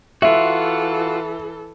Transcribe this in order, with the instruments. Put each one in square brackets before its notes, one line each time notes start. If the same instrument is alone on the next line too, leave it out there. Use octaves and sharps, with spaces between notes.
[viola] E3 A4 [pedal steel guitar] F4 F#4 [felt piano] E5